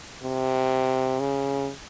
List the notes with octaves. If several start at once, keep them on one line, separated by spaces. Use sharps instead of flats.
C3
C#3